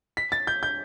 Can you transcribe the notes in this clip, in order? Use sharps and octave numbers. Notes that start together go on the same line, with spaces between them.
B6
A6
G6
G6